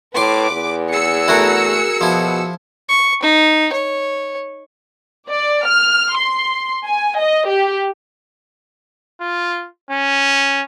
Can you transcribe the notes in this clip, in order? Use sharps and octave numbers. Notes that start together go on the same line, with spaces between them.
A2 B4 C6 D6
E2
G#4 E6 C#7
A3 E4 F#4 A#4
B2 F3 E4
C#6
D#4
C#5
D5
F6
C6
G#5
D#5
G4
F4
C#4